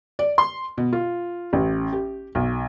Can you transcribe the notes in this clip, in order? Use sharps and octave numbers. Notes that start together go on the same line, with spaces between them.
D5
C6
B2
F4
A1
G4
B1